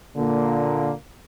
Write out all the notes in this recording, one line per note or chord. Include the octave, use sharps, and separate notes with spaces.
A#2 D3 A#3